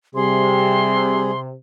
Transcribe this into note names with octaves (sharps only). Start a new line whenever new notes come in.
C3 G3 G#4 C6